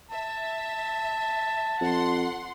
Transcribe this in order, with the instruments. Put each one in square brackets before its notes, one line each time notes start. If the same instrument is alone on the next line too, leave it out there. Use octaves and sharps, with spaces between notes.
[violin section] E5 [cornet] A5
[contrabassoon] F2 [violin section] F#5 C6